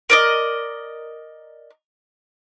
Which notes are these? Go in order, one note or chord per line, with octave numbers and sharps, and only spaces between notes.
A#4 D5 D#5